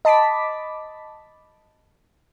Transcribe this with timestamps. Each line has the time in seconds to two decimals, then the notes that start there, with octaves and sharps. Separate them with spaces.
0.05 D#5 A5 B5 D6 B6